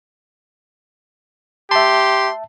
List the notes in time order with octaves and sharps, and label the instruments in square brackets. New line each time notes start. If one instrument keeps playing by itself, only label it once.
[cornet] G4 [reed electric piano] E5 A5 [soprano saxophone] C6